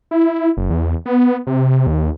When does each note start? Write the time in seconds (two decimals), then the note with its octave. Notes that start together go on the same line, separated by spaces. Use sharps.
0.11 E4
0.57 F#1
0.70 E2
1.06 B3
1.47 C3
1.87 D#2